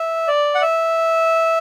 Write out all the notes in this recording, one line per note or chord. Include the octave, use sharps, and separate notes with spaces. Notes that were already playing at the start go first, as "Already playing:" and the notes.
Already playing: E5
D5
F#5
E5